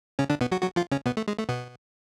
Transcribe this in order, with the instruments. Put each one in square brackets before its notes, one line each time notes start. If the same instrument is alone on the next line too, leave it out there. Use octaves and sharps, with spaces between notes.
[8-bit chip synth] C#3 C#4
D3 D4
B2 B3
F#3 F#4
F#3 F#4
F3 F4
C#3 C#4
B2 B3
A3
G#3
A3
B2 B3